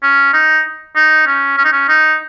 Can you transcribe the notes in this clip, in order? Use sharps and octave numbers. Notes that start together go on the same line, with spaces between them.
C#4
D#4
D#4
C#4
C#4
D#4
C#4
D#4